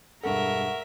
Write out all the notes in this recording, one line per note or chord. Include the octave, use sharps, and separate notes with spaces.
E1 G2 A4 A#4 E5 F#5 C#6